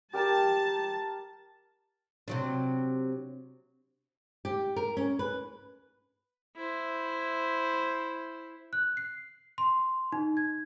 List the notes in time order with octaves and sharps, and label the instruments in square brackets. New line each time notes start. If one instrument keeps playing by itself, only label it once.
[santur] G4 A#4 G5 [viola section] A5
[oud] C3 F#3 D4
[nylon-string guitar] G4
A#4
C#4
B4
[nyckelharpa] E4 C5
[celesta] F#6
C7
C6
D#4
G#6